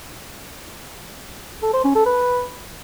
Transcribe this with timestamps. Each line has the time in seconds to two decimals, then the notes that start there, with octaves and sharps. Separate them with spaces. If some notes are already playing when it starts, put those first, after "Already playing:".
1.63 A4
1.73 C5
1.84 C#4
1.95 A4
2.06 B4